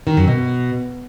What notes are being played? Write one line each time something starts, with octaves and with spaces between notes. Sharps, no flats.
D#3
F#2
B2